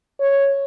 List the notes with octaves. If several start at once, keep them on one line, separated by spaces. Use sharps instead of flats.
C#5